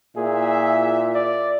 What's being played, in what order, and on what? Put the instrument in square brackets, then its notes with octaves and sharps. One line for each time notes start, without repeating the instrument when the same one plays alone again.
[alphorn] A#2 [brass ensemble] E4 F4 E5 [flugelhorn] G#4
[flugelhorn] D5